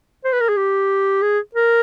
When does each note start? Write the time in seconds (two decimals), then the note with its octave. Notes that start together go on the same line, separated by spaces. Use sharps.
0.25 C5
0.33 B4
0.41 A#4
0.49 G#4
0.57 G4
1.22 G#4
1.55 A#4